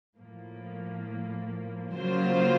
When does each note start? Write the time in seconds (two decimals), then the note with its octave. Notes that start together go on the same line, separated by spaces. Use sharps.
0.16 A2 F3 A#3
1.95 C#3 F#3 A#3 F4 C5